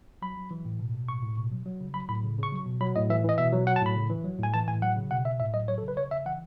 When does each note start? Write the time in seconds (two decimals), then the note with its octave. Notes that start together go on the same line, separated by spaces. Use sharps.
0.22 F#3 B5
0.37 F#3
0.51 E3
0.65 A2
0.80 B2
0.94 B2
1.09 A2 C#6
1.23 A2
1.37 B2
1.52 F#3
1.66 F#3
1.81 C#3
1.94 F#3 B5
2.08 A2 B5
2.24 C#3
2.38 C#3 C#6
2.52 F#3
2.66 B2
2.81 F#3 B5
2.96 A2 D#5
3.10 E3 E5
3.24 E3 D#5
3.38 B2 E5
3.52 F#3
3.67 F#3 F#5
3.76 A5
3.81 A2 B5
3.96 C#3
4.10 E3
4.25 F#3
4.39 A2 G#5
4.54 E3 A5
4.68 A2 G#5
4.82 F#3 F#5
4.96 C#3
5.11 B2 F#5
5.25 B2 E5
5.40 A2 E5
5.54 F#3 D#5
5.68 F#3 C#5
5.78 A4
5.83 C#3
5.88 B4
5.97 C#3 C#5
6.11 C#3 E5
6.26 E3 F#5